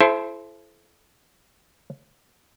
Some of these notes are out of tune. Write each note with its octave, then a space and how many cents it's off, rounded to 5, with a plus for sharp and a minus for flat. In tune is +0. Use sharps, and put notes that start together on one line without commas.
E4 +30 A4 -30 C5 +0